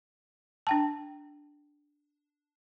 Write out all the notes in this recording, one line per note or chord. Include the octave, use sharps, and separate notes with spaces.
D4 G5 A5